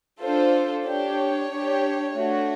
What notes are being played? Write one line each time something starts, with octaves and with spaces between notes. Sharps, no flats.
D4 F4 A4 C5
D4 G4 C#5
D4 G4
A3 D4 F#4